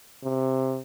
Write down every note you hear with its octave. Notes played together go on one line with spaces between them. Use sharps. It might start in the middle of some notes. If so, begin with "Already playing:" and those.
C3